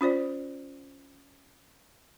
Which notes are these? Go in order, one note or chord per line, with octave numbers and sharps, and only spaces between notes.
C#4 F4 C5 D5